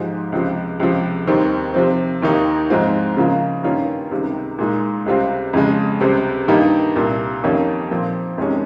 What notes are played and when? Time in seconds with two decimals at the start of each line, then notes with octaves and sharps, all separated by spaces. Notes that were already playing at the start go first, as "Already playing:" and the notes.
Already playing: G#2 F3 G#3 D#4 G4
0.32 C#2 C3 F3
0.80 C#2 C3 F3
1.27 D#2 D#3 G3 C4
1.74 C3 F3 C4
2.22 D#2 D#3 A#3 D#4 G4
2.70 G#2 F3 G#3 C4 F4
3.17 C#3 F3 A#3 F4
3.64 G2 D#3 A#3 C#4 F4
4.11 C#2 C3 D#3 G3
4.58 A#2 G#3 D#4
5.06 C#2 C3 G3 C4 F4
5.53 F2 C#3 G#3
6.00 C#2 C3 G3 C4 G4
6.48 G2 D#3 A#3 D#4 G4
6.96 C2 A#2 G3
7.44 F2 D#3 A#3 C#4 G4
7.91 A#2 F3 C4
8.38 F2 C3 D#3 G#3 C#4